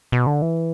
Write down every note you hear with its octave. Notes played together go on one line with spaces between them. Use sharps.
B2
D3
E3